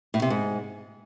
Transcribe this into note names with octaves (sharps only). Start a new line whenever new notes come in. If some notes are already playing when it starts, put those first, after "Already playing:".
A2
C3
G#2